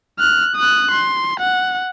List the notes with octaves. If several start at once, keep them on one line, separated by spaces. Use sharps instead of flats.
F6 F#6
D#6 F#6
C6
F#5